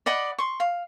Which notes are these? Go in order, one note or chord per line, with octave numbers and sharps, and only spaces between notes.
D5 D#5 F#5 B5
C6 C#6
F5